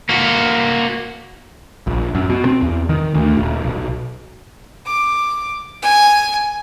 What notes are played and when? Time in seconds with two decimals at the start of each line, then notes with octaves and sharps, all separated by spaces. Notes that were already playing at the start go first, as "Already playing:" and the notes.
0.09 A#3 F#4
1.87 A#1
2.15 F#2
2.30 B2
2.45 C4
2.62 E2
2.89 D#3
3.14 D2
3.37 D#1
3.64 B1
4.86 D6
5.82 G#5